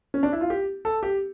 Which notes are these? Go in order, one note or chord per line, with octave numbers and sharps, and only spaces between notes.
C#4
D4
E4
F4
G4
A4
G4